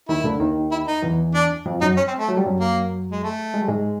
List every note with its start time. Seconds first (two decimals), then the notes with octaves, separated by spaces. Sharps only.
0.09 D#2 D#3 E4
0.24 D2 D3
0.40 D#2 D#3
0.72 E4
0.87 D#4
1.02 E2 E3
1.35 D4
1.66 F2 F3
1.81 F#2 F#3 D#4
1.97 C#4
2.08 C4
2.19 A3
2.29 F#3
2.37 G3
2.46 F#2 F#3
2.60 A#3
3.12 G#3
3.23 A3
3.54 G#3
3.62 G3
3.68 G#2 G#3